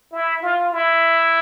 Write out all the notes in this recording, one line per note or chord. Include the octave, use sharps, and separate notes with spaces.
E4
F4
E4